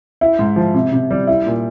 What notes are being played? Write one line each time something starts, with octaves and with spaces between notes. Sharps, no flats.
E4
G#2
F3
C3
C3
G3
E4
A#2